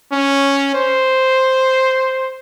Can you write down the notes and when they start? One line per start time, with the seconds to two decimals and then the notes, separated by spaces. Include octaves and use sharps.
0.12 C#4
0.75 C5